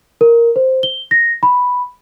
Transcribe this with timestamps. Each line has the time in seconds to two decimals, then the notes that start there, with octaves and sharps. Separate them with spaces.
0.21 A#4
0.56 C5
0.83 G7
1.11 A#6
1.43 B5